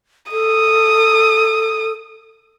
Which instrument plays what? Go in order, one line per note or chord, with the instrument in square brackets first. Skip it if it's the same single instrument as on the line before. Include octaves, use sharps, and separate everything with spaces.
[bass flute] A4 [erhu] D#6